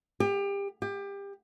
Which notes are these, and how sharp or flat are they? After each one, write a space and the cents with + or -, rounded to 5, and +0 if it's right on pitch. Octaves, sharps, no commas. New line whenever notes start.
G4 +30
G4 +25